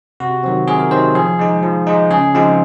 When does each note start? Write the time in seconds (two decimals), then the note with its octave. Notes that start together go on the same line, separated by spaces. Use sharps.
0.20 C3 F#4
0.43 D#3 F#3 C4
0.68 C3 G#4
0.80 A#4
0.91 D#3 F#3 C4 C5
1.15 F3 G#4
1.39 G#3 D#4
1.63 F3
1.87 G#3 D#4
2.10 C#3 G#4
2.34 F3 G#3 C4 D#4